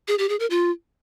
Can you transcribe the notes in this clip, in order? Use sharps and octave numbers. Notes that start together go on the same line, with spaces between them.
G#4
G4
G#4
A#4
F4